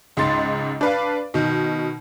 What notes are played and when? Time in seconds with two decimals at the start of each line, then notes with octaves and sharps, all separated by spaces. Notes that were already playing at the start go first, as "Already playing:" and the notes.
0.17 C#2 G#2 C6 A6
0.81 D4 B4 F5
1.34 B2 D#3